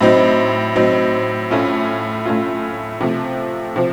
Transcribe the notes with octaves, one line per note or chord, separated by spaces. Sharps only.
A2 F#3 C4 D#4
A2 F#3 C4 D#4
A2 A3 C#4 F4
A2 A3 C#4 F4
C3 F3 A3
C3 F3